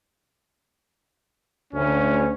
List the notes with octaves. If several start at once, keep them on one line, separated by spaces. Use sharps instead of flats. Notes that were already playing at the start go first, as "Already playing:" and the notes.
D2 C#4